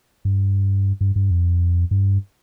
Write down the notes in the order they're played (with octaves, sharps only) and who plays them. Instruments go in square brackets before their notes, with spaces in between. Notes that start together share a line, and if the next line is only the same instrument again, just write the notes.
[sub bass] G2
G2
G2
F2
G2